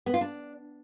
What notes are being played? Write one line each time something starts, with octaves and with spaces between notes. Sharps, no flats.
B3
F4
D4